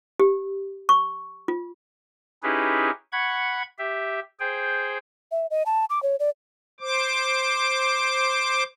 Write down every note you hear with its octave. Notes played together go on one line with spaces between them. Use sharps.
G4
C#6
F4
C#4 D#4 E4 G4 G#4 B4
F#5 B5 C#6 G#6
G4 E5
G#4 C5 G5
E5
D#5
A5
D6
C#5
D5
C5 D6